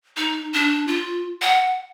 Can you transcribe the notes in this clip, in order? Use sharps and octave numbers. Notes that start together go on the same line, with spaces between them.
D#4
D4
F4
F#5